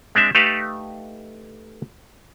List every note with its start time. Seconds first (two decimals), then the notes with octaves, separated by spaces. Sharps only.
0.15 G#3 C4 D4 E5
0.35 A3 D#4 G4 A4 B4 F5